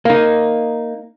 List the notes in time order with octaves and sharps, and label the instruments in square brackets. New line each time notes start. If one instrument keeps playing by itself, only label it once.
[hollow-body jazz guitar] A#3 D#4